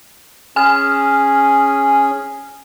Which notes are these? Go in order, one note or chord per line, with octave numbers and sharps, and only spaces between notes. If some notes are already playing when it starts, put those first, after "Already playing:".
C#4 G#4 G#5 F6